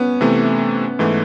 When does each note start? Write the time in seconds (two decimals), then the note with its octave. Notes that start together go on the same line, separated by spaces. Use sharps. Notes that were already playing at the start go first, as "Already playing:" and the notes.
Already playing: B3 C#4
0.21 C3 E3 A3
0.99 G#2 E3 A3